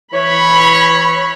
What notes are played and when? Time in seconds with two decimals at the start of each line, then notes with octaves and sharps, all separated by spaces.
0.13 E3 C#5 B5